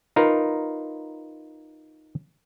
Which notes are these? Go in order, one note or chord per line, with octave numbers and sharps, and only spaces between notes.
D#4 F4 A#4 B4